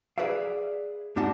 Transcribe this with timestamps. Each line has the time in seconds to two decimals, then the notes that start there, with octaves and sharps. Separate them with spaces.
0.18 G#4 B4 D5 E5 F5
1.17 G2 D4 G4 D#5 F#5 A5